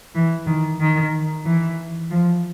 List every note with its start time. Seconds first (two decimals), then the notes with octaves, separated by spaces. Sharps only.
0.14 E3
0.46 D#3
0.80 D#3
1.44 E3
2.10 F3